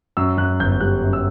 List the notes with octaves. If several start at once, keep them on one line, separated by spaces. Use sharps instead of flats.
F#2 E6
F#2 F#6
G1 G6
G3 F#6
F#2
E6